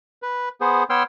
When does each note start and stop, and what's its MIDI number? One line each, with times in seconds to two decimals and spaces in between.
0.22 0.49 71
0.61 0.84 59
0.61 0.84 68
0.61 0.84 72
0.90 1.03 59
0.90 1.03 73
0.90 1.03 79
0.90 1.03 84
0.90 1.03 88
0.90 1.03 89